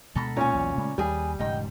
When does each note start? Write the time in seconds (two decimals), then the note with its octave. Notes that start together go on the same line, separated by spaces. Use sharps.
0.15 D2 B2 G#3 A4 A#5 B5
0.37 A#2 C#4 C#5 D5 G#5
0.54 B1 E2 B2
0.78 C#3 G#3 A3
0.98 D#2 G3 G#4 B4 G#5
1.39 E1 G#2 C#3 D#4 G5